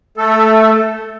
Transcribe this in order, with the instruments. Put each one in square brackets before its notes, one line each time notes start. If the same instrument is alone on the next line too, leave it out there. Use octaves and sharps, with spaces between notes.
[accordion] A3 A4